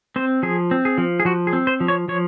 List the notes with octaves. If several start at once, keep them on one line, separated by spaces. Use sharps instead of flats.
C4 C5
F3 G#4
C4
G#4
F3
G#4
F3 F#4
G#4
C4
C5
F3
C#5
F3 C#5